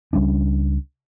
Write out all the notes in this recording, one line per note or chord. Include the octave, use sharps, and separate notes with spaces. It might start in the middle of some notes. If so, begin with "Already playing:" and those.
C#2 G3 C#4 D4